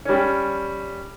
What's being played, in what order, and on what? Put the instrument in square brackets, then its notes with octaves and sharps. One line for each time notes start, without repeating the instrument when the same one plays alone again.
[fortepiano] G3 C#4